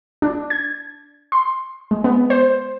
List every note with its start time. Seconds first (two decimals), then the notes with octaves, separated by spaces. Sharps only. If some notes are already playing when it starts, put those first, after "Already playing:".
0.22 D4
0.50 G#6
1.32 C6
1.91 G#3
2.04 B3
2.30 C5